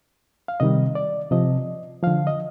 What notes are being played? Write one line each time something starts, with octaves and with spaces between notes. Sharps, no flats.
F5
C3 D#3 G3 D#5
D5
C3 F3 D#5
D3 F3 F5
D#5